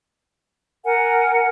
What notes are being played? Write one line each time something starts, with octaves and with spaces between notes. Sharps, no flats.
A#4 F#5 G#5